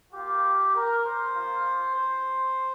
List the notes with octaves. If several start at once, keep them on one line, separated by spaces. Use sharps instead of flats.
A#3 F4 G4
A#4
C5
A#3 F4
C5